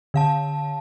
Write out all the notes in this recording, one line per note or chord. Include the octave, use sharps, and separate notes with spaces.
D3 F5 A5